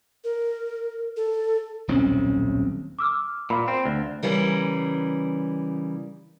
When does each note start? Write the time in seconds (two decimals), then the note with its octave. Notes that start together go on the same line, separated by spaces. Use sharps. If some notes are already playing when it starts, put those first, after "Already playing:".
0.24 A#4
1.17 A4
1.88 D#1 B1 C4 C#4
2.99 D6 E6 F6
3.50 A#2 F5 B5
3.68 C4
3.86 D2
4.23 C#3 E3 G3 A#4